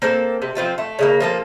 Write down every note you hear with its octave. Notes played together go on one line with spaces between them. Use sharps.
A#3 C4 A4
C3
F3 C4 F4 A4
A3
C#3 G3 A#3
F3 A#3 A4